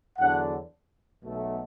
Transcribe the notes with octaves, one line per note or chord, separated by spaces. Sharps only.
E2 D3 F#3 D4 F#5
B1 B2 F#3 A3